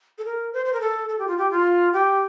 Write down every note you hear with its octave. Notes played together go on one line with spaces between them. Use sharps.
A4
A#4
C5
C5
A#4
A4
A4
G4
F4
G4
F4
G4